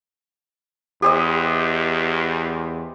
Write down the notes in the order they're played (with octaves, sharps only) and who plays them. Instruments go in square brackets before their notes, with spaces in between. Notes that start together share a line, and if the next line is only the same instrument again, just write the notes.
[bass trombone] E2 [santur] G4 C5 D#5